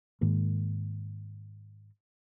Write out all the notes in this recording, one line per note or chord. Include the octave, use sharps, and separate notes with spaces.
G#2 D#3 G#3 A#3